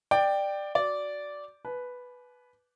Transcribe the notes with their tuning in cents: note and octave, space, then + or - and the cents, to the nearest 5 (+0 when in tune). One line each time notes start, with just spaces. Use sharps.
D5 +15 G5 +0
F#4 +0 D5 -10
B4 +0 G#5 +45